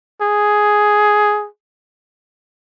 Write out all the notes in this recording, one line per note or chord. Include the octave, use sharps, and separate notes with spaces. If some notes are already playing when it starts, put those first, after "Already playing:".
G#4